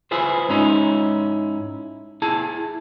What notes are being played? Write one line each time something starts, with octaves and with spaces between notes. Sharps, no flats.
E4 F4 G#4 B4 C5
G#2 C#4 D#4 E4
E4 G#4 A5